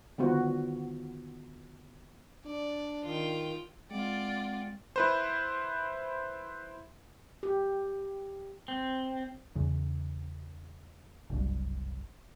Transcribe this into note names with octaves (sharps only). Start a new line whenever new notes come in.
D3 D#3 B3 F4 F#4 C5
D4 D5
D#3 F4 G5
G#3 C4 F4 D5 F#5
E4 B4 C5
G4
C4
E2 C#3
F#1 C2 G2